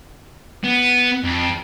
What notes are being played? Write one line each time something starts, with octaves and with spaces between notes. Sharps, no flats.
B3
F2